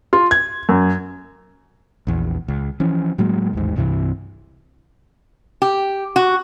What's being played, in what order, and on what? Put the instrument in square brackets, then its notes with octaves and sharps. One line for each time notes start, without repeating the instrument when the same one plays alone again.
[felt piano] F4
G#6
F#2
[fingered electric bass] A#1 E2
C#2
E3 F3 C#4
A2 F#3 G#3 A#3
A1 D#2 G#2
C2 G2 C3 E3
[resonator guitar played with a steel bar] G4
F#4